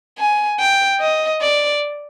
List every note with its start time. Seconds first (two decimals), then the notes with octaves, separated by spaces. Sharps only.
0.19 G#5
0.60 G5
1.00 D#5
1.42 D5